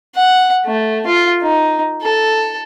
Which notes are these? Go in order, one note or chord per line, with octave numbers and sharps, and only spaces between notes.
F#5
A3
F4
D#4
A4